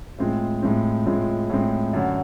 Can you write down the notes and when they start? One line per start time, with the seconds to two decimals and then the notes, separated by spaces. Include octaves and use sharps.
0.18 A2 F3 G#3 C4
0.63 A2 F3 G#3 C4
1.06 A2 F3 G#3 C4
1.49 A2 F3 G#3 C4
1.93 F#2 D3 F#3